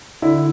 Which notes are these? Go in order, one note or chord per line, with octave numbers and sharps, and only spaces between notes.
D3 E4